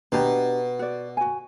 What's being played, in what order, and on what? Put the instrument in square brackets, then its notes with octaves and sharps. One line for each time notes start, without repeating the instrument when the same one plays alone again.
[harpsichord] B2 [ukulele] D4 G4 A#5
[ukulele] F#4 D5
F#4 G#5